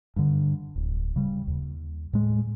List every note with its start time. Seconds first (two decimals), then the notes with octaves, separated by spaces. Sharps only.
0.16 G2 D3
0.76 D1
1.16 C#3 G3
1.47 D#2
2.13 A2 G#3